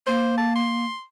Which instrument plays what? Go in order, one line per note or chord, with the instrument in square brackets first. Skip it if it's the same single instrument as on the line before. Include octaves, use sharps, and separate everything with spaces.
[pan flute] A#3 [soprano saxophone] C5
[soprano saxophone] A5
C6